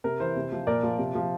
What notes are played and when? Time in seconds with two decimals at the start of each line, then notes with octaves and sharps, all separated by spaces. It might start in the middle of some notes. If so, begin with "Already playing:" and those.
0.04 C3 A#4
0.20 E3 C5
0.36 C3
0.52 F3
0.67 A#2 A#4 D5
0.83 F3
0.98 C3
1.15 F3